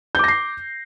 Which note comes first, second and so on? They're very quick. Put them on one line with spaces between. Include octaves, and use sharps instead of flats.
G6 D6 A#6 C7